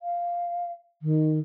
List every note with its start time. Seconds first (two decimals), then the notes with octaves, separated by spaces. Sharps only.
0.01 F5
1.02 D#3